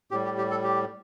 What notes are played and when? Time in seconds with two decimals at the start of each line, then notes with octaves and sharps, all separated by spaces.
0.11 A2 G3 G4
0.25 G4
0.38 G4
0.51 A4
0.64 G4